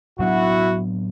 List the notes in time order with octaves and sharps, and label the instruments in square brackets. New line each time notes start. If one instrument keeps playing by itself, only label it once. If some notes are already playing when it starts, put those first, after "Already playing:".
[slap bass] A2 F#3 B3 D4 [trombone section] E4 F#4